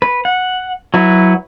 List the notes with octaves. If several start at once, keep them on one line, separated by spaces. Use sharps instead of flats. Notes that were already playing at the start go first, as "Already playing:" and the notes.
B4
F#5
F#3 E4 F#4 B4